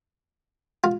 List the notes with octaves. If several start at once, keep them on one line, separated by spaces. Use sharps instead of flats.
F4